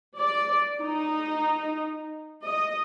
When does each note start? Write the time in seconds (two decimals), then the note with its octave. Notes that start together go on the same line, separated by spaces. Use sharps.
0.18 D5
0.80 D#4
2.44 D#5